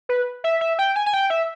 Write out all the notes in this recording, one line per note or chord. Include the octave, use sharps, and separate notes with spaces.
B4
E5
E5
G5
G#5
G#5
G5
E5